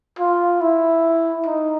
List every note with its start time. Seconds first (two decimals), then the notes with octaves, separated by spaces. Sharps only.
0.19 F4
0.61 E4
1.46 D#4